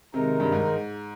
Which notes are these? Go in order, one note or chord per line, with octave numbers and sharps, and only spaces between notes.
C3 D#3 G#3 D#4 A#4
G2
G#2